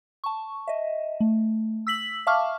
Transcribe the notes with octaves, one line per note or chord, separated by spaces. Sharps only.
A5 C#6
D#5 E5
A3
E6 B6 F#7
E5 F5 A5 C#6 D6 F6